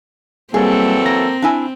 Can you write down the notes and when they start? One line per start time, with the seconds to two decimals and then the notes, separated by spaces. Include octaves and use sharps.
0.54 E3 F#3 G3 A#3 C4 G#4 A4
1.06 A#3 A#6
1.42 D4 E4 G#5